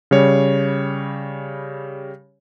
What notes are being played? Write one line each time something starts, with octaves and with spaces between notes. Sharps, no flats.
C#3 G3 C#5